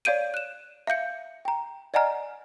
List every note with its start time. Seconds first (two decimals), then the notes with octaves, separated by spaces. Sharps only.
0.05 C#5 D5 F5 G6 D7 D#7
0.34 F#6 E7
0.87 E5 F5 G6 C#7
1.45 G5 A#5
1.94 D5 D#5 F#5 G#5 A#5 F6